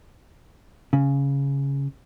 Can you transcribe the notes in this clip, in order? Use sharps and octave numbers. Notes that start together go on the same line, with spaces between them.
C#3